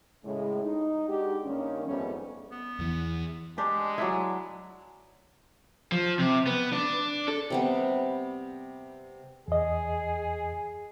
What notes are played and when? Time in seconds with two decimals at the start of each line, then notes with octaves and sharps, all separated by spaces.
0.25 A2 C#3 G#3
0.63 D#4
1.08 G#3 D4 D#4 F#4 G4
1.44 G2 D#3 A#3 C#4
1.86 F2 G#2 G3 A3 B3 C#4
2.51 B3
2.79 E2 E3
3.58 G#3 D4 G4
3.98 F#3 D4 E4
5.92 F3
6.19 C3
6.47 B3
6.72 D4
7.28 A4
7.50 C3 G3 B3
9.48 E2 G#4 D#5